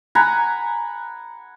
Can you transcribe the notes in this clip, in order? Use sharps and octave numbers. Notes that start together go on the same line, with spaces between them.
F#5 G#5 A#5 B5